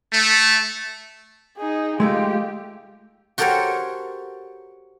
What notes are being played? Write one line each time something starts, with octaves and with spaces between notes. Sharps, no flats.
A3
D#4 G#4
G#3 A3 D#4 F4 G4
F#4 G4 A4 A#4 C5 C#5